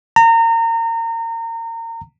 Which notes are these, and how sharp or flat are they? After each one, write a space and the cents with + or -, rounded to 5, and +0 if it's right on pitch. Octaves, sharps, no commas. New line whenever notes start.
A#5 -30